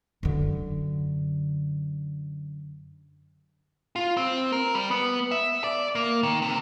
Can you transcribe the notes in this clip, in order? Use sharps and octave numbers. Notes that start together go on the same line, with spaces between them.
F#2 D3
F4
C4
A#4
G3
B3
E5
D5
A#3
D#3
C3